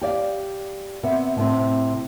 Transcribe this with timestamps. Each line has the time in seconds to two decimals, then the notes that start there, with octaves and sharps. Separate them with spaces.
0.01 G4 D5 F5
1.03 C3 B3 E5
1.37 A2 C3 C4